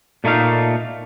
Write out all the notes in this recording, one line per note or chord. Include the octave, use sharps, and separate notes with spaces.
A#2 A3 A#3 D#4 F5